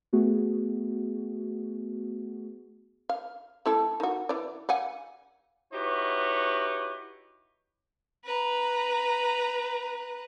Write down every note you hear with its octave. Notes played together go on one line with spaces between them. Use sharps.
A3 B3 F#4 G#4
F5
A3 E4 A4
D#3 F#4
E3 D5
F5 F#5 G#5
D#4 E4 F#4 G4 B4 C#5
B4 A#5